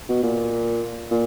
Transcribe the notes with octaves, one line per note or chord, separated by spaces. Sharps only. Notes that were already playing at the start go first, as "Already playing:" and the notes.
B2
A#2
A#2